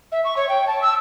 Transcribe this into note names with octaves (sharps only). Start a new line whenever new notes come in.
E5
C#6
C#5
G5
A5
E6